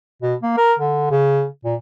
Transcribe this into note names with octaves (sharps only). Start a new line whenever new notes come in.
B2
A#3
A#4
D3
C#3
A#2